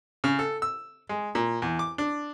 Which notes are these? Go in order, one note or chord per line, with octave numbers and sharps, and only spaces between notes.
C#3
A4
E6
G#3
A#2
E2
D6
D4